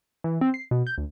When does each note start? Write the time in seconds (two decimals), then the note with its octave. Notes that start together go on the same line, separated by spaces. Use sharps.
0.24 E3
0.41 C4
0.54 C7
0.71 B2
0.87 G6
0.98 D2